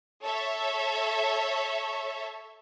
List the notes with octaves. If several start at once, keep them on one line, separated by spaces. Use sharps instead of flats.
A4 C#5 E5